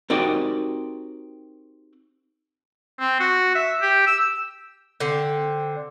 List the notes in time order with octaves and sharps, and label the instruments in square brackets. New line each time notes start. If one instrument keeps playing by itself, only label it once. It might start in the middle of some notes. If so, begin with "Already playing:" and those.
[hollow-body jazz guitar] C4 D#4 F#4 G4 A#4 D5
[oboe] C4
F#4
E5
G4
E6
[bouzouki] D3 C4